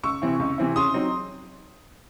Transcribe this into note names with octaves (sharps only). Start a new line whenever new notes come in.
C#2 C#6 E6
C3 E3 C4 E4
C#2
C3 E3 C4 E4
C#3 C6 D#6
F#3 C4 D#4